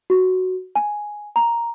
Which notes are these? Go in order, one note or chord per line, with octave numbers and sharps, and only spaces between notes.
F#4
G#5
A#5